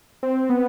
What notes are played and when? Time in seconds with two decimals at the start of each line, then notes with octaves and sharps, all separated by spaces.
0.23 C4
0.49 B3